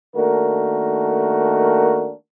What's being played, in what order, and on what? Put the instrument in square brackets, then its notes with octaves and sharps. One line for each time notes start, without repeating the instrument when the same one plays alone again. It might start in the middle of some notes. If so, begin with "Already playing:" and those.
[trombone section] D#3 A3 A#3 D4 F#4 A#4